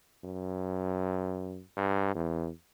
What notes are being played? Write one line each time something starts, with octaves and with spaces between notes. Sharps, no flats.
F#2
G2
E2